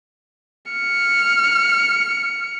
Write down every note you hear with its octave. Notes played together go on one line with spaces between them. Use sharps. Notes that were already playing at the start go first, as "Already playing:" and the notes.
F6 C#7